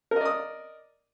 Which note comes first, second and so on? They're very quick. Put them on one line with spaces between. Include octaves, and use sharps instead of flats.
A#4 D#5 D5 D#6